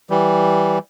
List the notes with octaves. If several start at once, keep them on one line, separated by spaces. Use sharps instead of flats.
E3 G3